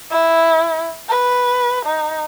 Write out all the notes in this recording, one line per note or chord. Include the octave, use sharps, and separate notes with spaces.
E4
B4
D#4